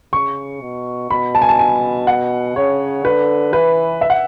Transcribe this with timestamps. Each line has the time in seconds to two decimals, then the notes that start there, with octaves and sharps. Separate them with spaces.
0.13 C#3 C#6
0.62 B2
1.10 B2 B5
1.35 A5
1.42 G#5
1.49 A5
1.59 G#5
2.07 F#5
2.56 C#3 C#5
3.04 D3 B4
3.53 E3 B4
4.01 E5
4.10 F#5